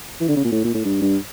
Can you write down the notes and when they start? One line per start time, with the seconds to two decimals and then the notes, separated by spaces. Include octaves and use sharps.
0.21 E3
0.29 D3
0.37 C#3
0.45 A#2
0.52 A2
0.64 A#2
0.75 A2
0.85 G2
1.02 G2